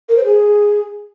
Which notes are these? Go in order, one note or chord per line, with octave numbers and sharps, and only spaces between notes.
A#4
C5
G#4